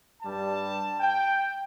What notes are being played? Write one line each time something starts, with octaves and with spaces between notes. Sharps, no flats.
G2 G3 A5
G5